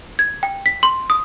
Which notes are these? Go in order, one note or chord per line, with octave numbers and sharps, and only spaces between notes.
G#6
G5
B6
C6
D#6